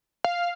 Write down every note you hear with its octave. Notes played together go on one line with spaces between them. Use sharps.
F5